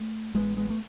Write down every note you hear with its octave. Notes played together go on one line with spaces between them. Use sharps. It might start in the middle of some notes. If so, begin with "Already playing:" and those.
Already playing: A3
A1 G#3 B3
G#3 B3
A3